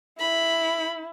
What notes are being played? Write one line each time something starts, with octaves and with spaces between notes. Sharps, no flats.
E4 B5